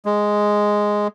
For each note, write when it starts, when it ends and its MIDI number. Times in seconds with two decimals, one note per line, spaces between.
0.06 1.08 56